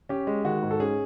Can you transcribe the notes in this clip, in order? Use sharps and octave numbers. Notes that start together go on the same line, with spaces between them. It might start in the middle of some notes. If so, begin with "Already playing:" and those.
C#4 G4
G#3
D#3 F#4
G#2
A4
C#4 G#4